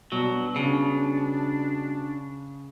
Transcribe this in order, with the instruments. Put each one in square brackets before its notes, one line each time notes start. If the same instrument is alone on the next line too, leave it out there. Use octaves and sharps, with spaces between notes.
[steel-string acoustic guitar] G2 B2 [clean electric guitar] F#3
[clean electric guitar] C#3 [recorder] D4